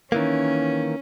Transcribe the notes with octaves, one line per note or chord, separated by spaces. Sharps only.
D#3 E3 A#3 C#4